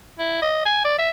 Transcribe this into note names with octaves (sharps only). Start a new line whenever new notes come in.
E4
D#5
G#5
D5
E5